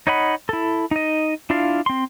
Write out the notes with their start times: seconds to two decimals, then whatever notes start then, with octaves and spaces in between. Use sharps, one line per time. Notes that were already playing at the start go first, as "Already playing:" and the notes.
0.07 D#4 C#5 D#5 F#5 B5
0.49 E4 A4
0.91 D#4 D#5
1.50 D4 E4 F4 D5 F5
1.86 C4 C6